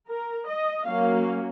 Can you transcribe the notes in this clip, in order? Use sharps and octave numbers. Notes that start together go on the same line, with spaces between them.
A#4
D#5
F#3 A#3 C#4 F5